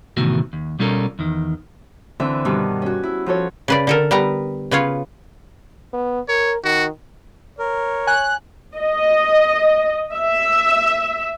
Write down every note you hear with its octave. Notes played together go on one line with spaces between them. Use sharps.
A2 C3 D#3 E3 B3 F#4
D#2
B2 G3 C#4 F4 A4 A#4
E2 D#3
D3 E3 C4 E5
G2 B2 D#3
C#4 F#4
E4
F3 F#4 A4 C#5
C#3 B4 D5
D3 A4 A#4
G3 B3 A#5
C#3 B3 F4 C#5
B3
A#4 C#5
D#3 F#4
A#4 C#5
G#5 F#6
D#5
E5